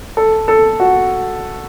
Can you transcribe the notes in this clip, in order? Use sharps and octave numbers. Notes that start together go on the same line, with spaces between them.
A4
A4
F#4